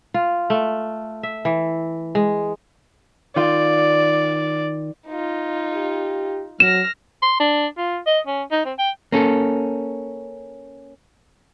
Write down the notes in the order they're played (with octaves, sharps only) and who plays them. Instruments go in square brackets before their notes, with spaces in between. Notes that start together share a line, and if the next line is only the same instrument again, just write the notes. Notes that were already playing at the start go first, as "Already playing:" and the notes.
[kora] F4
A3
E5
E3
G#3
[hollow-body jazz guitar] D#3 F4 [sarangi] D5
[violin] D#4 F4
[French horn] G4
[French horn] F#3 [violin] F6 A#6 [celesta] E7
[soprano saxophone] C6
D4
F4
D#5
C#4
D#4
C4
G5
[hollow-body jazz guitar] A#3 C#4 A4